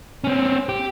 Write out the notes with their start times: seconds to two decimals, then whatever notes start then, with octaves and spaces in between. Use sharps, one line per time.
0.24 C4 C#4
0.69 G4